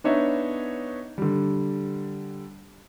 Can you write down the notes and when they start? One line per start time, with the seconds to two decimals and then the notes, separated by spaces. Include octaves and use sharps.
0.04 B3 D4 D#4 C#5 E5
1.18 D3 G3